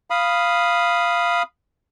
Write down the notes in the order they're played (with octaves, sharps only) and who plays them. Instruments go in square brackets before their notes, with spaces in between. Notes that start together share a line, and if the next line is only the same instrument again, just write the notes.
[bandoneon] F5 B5 D#6